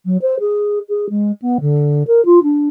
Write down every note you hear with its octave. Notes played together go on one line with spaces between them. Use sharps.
F#3
C5
G#4
G#4
G#3
B3
D3
A#4
F4
D4